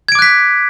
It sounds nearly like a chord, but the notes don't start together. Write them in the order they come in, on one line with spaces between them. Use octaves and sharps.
G#6 D7 D6 F#6 B6